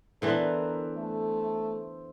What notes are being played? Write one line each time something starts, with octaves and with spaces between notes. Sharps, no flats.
D3 E3 B3 A#4 C5 D5 E5
A3